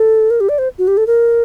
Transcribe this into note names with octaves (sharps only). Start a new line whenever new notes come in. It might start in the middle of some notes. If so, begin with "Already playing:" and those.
Already playing: A4
A#4
G4
D5
C5
F#4
G4
A4
A#4